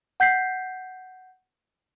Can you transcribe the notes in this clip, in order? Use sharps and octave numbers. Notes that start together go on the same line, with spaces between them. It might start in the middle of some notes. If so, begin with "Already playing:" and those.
F#5 G6 B6 C7